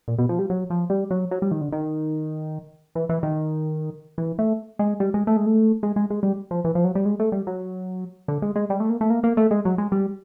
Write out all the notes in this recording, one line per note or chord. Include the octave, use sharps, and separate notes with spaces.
A#2
B2
F3
G3
F#3
F3
G3
F#3
F#3
G3
D#3
D3
D#3
E3
E3
D#3
E3
A3
G#3
G3
G#3
A3
G#3
A3
G#3
G#3
G#3
G3
F3
E3
F3
F#3
G3
G#3
A3
G3
F#3
D3
G#3
G#3
G3
A3
A#3
A3
A#3
A#3
A3
G#3
F#3
G#3
G3